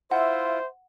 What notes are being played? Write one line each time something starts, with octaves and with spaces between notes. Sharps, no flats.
E4 F4 C5 E5 F#5